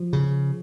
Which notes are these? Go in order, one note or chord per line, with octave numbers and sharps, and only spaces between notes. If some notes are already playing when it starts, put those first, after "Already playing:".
Already playing: F3
C#3